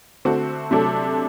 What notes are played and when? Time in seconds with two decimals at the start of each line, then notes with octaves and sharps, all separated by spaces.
0.25 D3 A3 C4 F#4
0.71 C3 F#3 A3 D4 A4